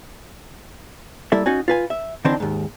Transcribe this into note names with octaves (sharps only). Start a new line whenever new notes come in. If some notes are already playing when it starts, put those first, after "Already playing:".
G3 A#3 E4 A4 E5
C#4 D#4 F#4 G#5
F4 B4 G#5
E5
D3 E3 C4 D4 D#4 C5
D#2 G#2